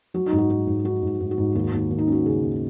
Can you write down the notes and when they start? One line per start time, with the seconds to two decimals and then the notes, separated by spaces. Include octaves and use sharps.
0.14 F#3 F#4
0.26 D#4
0.32 G#2
0.38 F#4
0.50 G#2 D#4
0.67 G#2
0.85 D#4 F#4
1.03 G#2
1.20 G#2
1.31 F#4
1.38 G#2
1.55 D#2 F#4
1.72 D#2
1.91 D#2
1.98 D#4
2.07 C#4 F#4
2.26 C#3 G#4
2.43 D#2